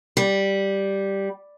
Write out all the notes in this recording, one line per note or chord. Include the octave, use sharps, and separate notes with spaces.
G3